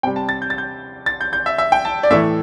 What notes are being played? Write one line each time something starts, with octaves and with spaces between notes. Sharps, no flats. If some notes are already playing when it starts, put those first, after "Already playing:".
C3 G3 G5
A5
A6
G6
A6
G6
A6
G6
G6
E5
E5
G5
A5
D5
A2 E3 A3 E5